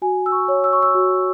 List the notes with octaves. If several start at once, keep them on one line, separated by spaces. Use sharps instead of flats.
F#4 G#5
E6
C#6
C#5
E6
C#6
E6
F#4